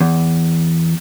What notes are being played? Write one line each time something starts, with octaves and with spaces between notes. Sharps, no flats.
E2